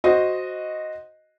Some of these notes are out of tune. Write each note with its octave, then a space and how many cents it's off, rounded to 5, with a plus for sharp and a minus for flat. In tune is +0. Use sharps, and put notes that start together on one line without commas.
F#4 -5 C5 +0 D#5 +0